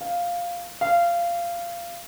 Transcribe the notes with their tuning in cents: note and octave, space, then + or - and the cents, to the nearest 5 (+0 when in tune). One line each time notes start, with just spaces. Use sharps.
F5 +0
F5 -20